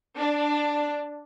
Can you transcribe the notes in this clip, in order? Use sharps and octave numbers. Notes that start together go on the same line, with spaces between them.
D4